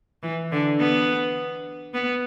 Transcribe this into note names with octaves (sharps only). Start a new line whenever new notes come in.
E3
D3
B3
B3